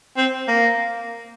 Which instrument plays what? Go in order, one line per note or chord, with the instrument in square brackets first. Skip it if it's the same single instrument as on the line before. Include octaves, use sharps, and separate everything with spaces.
[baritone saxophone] C4
A#3